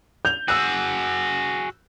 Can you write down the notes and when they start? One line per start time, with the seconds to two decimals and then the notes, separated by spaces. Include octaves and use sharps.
0.25 G6 F7
0.48 F#4 G#4 E6 F#6